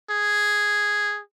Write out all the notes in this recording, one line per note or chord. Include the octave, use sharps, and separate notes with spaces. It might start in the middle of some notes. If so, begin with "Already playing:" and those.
G#4